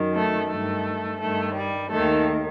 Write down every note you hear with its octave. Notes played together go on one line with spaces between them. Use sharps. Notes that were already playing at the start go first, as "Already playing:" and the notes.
Already playing: F#2 D#3
A3
G2 D#3 A3
G2 D#3 A3
G3
D#2 D#3 A3